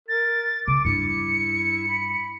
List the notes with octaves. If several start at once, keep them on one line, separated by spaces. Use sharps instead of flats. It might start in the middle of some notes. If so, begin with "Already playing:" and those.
A#4 A6
C#3 D6
G2 D4 E4 C#7
B5